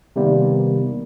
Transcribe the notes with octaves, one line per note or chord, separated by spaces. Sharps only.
C3 D#3 G3 A#3 B3